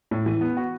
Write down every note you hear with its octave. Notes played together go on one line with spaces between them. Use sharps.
A2
E3
B3
F#4